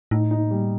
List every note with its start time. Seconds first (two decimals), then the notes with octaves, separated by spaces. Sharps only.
0.11 A2 D#4
0.31 D#4
0.51 G3